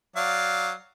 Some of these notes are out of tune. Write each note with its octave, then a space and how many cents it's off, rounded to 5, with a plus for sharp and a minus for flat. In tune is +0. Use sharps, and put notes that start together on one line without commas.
F#3 +0 D5 +0 F5 +0